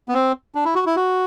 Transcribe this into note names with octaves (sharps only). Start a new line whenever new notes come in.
B3
C4
D4
E4
F#4
E4
F#4